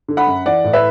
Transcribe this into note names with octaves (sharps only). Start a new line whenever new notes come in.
D3
F#5 B5
F#2
E3 D5 F#5
A2
B4 E5